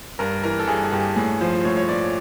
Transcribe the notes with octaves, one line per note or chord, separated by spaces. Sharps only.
G2 A#4
E3 A#4
A4
G2 G#4
G#4
G2 G4
A2 G#4
F3 C5
A2 C#5
C#5
A2 D5